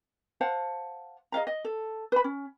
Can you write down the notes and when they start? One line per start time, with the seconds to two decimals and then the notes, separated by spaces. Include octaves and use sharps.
0.41 C5 F5 F#5 A5
1.32 G#4 D#5 F5 A#5
1.47 D#5
1.65 A4
2.12 B4 B5
2.24 C#4